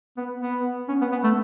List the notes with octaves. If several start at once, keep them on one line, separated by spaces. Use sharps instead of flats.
B3
B3
C#4
B3
B3
A3